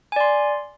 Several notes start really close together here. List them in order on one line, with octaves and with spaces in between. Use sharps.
G#5 D5 C6